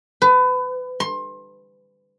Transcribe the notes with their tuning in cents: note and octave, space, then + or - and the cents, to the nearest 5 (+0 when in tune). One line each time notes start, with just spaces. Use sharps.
B4 +30
C6 +25